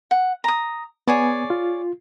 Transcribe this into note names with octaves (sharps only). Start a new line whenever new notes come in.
F#5
A#5 D#6
B3 G#4 C#5 D5 G#5
F4